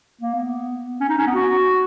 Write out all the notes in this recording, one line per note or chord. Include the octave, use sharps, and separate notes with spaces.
A#3
B3
C#4
D#4
C#4
B3
F#4